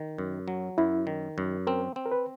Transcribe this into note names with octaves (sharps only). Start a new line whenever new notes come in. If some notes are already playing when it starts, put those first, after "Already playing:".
Already playing: D#3
F#2
F#3
F#2 E4
D#3
F#2
C4 A#4
C4
A#4
B4